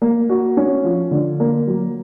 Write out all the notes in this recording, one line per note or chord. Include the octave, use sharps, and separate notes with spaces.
A#3
F#4
C#4
F3
D3
A#3
F#3